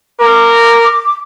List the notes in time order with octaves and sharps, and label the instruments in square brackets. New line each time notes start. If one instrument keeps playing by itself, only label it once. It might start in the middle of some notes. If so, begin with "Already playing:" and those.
[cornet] A#4 [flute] D6